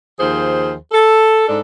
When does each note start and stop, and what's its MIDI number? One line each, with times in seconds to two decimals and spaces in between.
0.19 0.74 39
0.19 0.74 53
0.19 0.74 68
0.19 0.74 72
0.92 1.44 69
1.48 1.60 44
1.48 1.60 62
1.48 1.60 69